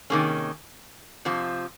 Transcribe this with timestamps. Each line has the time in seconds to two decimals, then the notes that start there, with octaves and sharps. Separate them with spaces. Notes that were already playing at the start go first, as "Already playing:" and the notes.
0.10 C3 D#3 A#3 C#4 G#4
1.25 F2 C3 F3